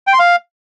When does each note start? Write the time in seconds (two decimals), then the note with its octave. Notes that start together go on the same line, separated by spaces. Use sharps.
0.07 G5
0.13 C6
0.19 F5